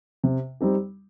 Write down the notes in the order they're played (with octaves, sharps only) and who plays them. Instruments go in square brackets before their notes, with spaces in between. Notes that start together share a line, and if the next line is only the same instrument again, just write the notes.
[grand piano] C3
G3 C4 D#4 G4